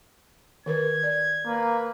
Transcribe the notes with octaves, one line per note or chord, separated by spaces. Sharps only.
D#3 A#4 B4 G#6
D5
A#3 B4